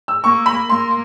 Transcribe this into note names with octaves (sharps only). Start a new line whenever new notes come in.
E6
A#3 C#6
B5
A#3 C6